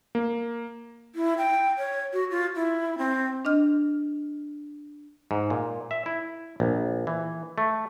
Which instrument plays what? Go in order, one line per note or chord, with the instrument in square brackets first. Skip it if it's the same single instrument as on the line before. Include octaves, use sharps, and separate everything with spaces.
[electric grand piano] A#3
[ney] E4
G5
C#5
F#4
F4
E4
C4
[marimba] D4 D#5 F6
[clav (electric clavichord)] G#2
A#2
E5
E4
A#1
E3
A3